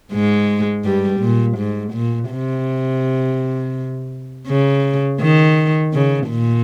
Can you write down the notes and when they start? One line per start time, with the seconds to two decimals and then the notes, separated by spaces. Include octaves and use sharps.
0.12 G#2 G#3
0.84 G2 G3
1.20 A#2
1.58 G#2
1.93 A#2
2.31 C3
4.48 C#3
5.21 D#3
5.94 C#3
6.30 A#2